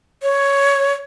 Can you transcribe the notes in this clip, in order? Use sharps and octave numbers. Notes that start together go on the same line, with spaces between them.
C#5